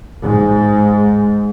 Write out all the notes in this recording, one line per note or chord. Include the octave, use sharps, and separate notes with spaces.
G#2